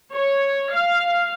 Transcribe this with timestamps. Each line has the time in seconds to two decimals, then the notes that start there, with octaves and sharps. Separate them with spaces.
0.14 C#5
0.73 F5